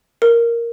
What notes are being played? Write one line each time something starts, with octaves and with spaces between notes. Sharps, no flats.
A#4